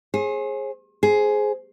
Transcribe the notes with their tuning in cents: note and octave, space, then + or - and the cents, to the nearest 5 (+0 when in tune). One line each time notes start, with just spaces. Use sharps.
G#4 +5 C5 +45
G#4 +10 C5 +0